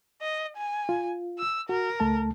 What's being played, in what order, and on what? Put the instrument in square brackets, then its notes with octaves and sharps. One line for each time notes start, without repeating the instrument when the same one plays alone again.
[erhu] D#5
G#5
[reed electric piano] F4
[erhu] E6
[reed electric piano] F#4 [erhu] A#4
[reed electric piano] C#2 A3 A5